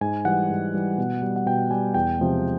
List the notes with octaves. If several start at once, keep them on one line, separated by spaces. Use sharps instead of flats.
G#2 G#5
E3 G3 F#5
G#2
E3 G3
B2
G3
F#5
B2 G5
G3 G#5
E2 G5
C3 F3 G#3